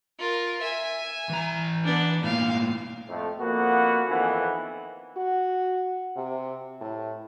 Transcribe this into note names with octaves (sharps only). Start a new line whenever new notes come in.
F4 A#4
E5 G#5
E3 A#5
B3 D4
A2 A#3 F5
F2 A3
F2 A#3 B3 F#4
F2 D#3 E3 B3
F#4
C3
A2